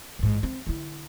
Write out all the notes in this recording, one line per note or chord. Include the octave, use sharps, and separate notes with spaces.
A1 G#2
C4
D3 E4